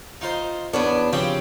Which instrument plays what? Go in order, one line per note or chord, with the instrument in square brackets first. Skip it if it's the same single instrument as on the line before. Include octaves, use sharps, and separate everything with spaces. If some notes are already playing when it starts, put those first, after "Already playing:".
[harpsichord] D#4 F4 C5
[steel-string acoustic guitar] E2 B3 D4 [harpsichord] C#4
[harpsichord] C#3 F3 C4 [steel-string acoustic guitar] G4